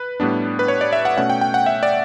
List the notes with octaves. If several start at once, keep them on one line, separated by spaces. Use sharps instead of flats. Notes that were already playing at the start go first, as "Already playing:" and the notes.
Already playing: B4
A2 G3 B3 D4
B4
C#5
D5
E5
F#5
B2 A3 C#4 F#5
G5
G5
F#5
E5
D5